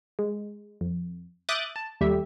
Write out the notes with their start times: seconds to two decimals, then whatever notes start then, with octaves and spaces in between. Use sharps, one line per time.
0.19 G#3
0.81 F2
1.49 E5 D6 D#6 F#6 G6 A6
1.76 A5
2.01 D#2 G3 A3 G4 E5